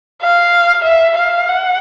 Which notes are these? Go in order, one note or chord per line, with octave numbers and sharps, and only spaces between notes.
F5
E5
F5
F#5